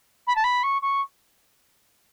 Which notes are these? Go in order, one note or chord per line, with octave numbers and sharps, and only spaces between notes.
B5
A5
B5
C#6
C#6